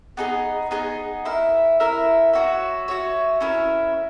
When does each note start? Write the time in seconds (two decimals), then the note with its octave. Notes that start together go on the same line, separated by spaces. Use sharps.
0.17 B3 D#4 G#4 D#5
0.71 B3 D#4 G#4 D#5
1.25 E4 A#4 E5
1.80 E4 A#4 E5
2.33 F#4 C#5 E5
2.88 F#4 C#5 E5
3.41 C#4 E4 A#4 E5